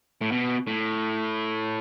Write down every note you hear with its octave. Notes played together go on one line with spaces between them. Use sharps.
A2
B2
A2